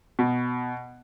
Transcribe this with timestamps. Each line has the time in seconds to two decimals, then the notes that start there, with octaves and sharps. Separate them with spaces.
0.19 B2